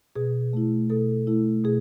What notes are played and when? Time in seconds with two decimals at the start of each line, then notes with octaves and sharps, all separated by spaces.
0.16 B2 G#4
0.53 A3 E4
0.90 B2 A4
1.27 A3 E4
1.64 B2 G#4